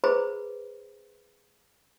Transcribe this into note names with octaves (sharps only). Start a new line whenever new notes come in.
G#4 B4 C5 A#5 B5